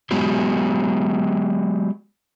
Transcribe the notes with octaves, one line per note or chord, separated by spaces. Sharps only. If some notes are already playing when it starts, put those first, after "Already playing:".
F#3 G#3 B3 G4